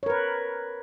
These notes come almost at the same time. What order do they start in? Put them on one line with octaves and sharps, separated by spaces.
C#5 A#4 B4